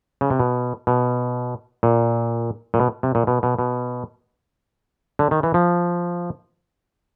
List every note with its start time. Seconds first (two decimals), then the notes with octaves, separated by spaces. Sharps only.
0.21 C#3
0.30 C3
0.40 B2
0.87 B2
1.83 A#2
2.74 A#2
2.80 B2
3.03 C3
3.15 A#2
3.27 B2
3.43 B2
3.59 B2
5.19 D3
5.31 D#3
5.43 E3
5.54 F3